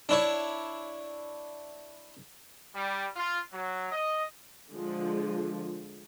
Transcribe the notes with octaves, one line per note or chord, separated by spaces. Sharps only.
D4 E4 C#5
G3
F4
F#3
D#5
D3 F3 G#3